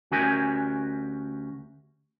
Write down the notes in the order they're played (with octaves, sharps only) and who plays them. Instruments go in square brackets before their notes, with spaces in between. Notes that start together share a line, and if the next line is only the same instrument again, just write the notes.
[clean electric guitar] D2 C#4 F#4 G4 A#4 G#5